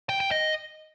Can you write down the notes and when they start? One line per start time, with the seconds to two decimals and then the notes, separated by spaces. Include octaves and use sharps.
0.09 G5
0.20 G5
0.31 D#5